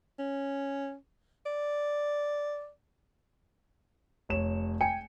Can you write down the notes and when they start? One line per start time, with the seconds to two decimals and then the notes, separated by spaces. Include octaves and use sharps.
0.19 C#4
1.46 D5
4.29 F1 C#5 E7
4.81 G5 G#5 C#7